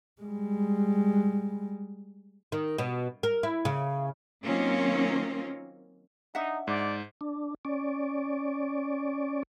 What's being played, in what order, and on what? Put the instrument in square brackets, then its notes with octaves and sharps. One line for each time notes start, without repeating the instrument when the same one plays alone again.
[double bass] G3 G#3
[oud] D#3
B2
A#4
E4
C#3
[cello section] D#3 F#3 A#3 C4 C#4 F4
[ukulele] D4 E5 F#5 [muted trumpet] D#4
[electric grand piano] G#2 [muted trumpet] D5
[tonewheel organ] D4
C#4 D5